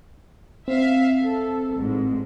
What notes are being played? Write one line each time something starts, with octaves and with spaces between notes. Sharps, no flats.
C4 E5 F5
A4
A1 G#2